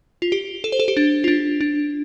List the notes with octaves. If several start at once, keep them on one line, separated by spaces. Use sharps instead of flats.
F4
G4
A4
C5
A4
G4
D4
F4
D4
D4